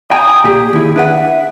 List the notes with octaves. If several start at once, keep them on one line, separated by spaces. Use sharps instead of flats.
G5 G#5 A#5 D#6
A#2 G4 G#4
D#2 E4
D4 B4 E5 F#5